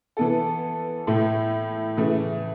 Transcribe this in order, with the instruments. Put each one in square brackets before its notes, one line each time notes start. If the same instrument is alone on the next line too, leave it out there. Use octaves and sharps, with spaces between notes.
[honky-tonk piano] E3 B3 A4
A2 A3 E4
C#3 E3 A3